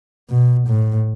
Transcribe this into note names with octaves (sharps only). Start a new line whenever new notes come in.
B2
A2